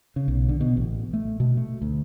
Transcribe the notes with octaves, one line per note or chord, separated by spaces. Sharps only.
C#3
B1
D3
B2
A1
A3
B2
A3
D2